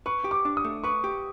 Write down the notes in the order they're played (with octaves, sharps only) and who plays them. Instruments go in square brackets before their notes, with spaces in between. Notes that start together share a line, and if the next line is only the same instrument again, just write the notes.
[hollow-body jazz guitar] B4 [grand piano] C#6
[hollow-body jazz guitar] G4
[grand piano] D6
[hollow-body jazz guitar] D4
[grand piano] D#6
[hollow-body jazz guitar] A3
[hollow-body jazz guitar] B4 [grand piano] C#6
[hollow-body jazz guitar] G4